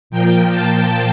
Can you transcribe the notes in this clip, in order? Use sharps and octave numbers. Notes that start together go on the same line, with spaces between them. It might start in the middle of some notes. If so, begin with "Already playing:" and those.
A#2 F3 A#3 G5
A5